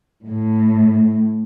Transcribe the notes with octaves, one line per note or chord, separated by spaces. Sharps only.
A2